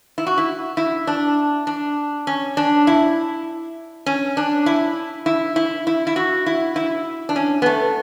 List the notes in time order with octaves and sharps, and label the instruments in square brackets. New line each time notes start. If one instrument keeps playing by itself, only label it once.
[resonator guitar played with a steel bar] E4
F#4
E4
E4
D4
D4
C#4
D4
E4
C#4
D4
E4
E4
E4
E4
E4
F#4
E4
E4
D4
C#4
B3
A3